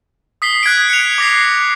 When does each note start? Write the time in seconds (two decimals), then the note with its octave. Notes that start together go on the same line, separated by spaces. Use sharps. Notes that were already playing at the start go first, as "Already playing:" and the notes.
0.42 D#6 B6 C7 G7
0.63 F#6 G#6 B6 D7
0.90 C#7 F7
1.18 D6 A#6 C7